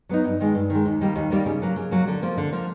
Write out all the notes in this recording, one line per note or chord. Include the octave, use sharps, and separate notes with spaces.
F#3 B3 D#4
G2
D#3 G#3
G2
D#3 G#3
D#2
D#3 G3 A#3
D#2
D#3 G3 A#3
C#3
F#3 A#3
C#3
F#3 A#3
D3
F3 A#3
D3
F3 A#3